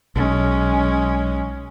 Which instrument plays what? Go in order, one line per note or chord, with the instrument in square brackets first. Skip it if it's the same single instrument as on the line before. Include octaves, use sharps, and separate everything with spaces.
[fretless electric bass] B1 [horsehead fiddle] G#3 C#4